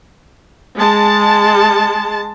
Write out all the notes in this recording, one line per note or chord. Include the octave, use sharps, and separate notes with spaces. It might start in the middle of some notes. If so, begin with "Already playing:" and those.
G#3 A5